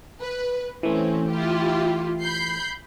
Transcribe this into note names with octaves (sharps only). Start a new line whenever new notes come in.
B4
E3 A3 C4 C#4
E4 F4 G4
B5 G6 C7